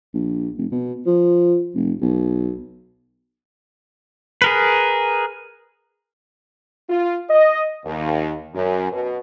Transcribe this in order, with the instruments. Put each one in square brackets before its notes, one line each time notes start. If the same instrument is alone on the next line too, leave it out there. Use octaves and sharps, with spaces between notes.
[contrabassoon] A#1
F1
B2
F3
F1
B1
[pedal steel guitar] G#4 A#4 B4
[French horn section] F4
D#5
D#2
F#2
B2